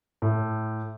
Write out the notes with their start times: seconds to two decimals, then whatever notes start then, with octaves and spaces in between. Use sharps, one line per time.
0.22 A2